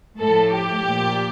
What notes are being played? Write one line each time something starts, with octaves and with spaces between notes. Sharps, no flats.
A2 F3 A4
G4
A#2 F3